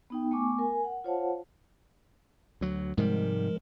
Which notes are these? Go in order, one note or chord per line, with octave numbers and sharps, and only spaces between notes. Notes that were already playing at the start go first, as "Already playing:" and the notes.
B3 D#4 G5
A3 B3 G#5 C#6 D6
A#4 G#5
F#5
F4 C5 C#5 F5 F#5 A5
D2 F#3
G#2 C3 F3 G3 G#3 A#4